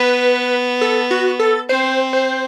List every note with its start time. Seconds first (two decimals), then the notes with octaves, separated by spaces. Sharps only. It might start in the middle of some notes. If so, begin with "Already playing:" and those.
Already playing: B3 B4
0.81 A4
1.11 F#4
1.39 A4
1.69 C4 C5
2.13 C5